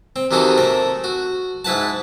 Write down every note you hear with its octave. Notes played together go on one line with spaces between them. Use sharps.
C4
C3 D#3 E3 D#4 F#4 A4
A3 C4 A#4
F#4
G#2 E4 B4 F#5 A5